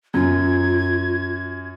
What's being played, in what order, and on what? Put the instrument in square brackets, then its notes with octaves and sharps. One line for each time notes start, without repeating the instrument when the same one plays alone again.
[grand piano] F#2 [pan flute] F4 [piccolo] G#6